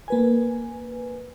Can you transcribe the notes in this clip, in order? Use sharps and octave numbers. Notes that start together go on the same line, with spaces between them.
A#3 B4 G#5